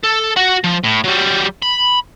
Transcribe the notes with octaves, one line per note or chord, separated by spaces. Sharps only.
A4
F#4 F#5
F3
A2
F#3 G3
B5